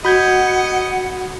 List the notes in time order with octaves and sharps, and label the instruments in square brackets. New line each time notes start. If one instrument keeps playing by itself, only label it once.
[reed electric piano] F#4 [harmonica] D#5 [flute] F#5 [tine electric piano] B5 G6 G#6